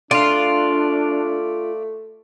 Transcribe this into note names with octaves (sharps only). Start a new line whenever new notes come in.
A3 D4 F4 D5 F5